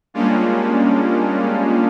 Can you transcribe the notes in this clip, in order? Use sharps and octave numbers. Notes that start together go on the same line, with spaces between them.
G3 G#3 A#3 C#4 D4 F4